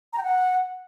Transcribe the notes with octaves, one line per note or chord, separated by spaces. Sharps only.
A#5
G5
F#5